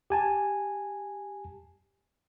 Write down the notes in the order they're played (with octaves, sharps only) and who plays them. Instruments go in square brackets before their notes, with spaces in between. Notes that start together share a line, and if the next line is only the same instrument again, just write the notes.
[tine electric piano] G4 G#5 A5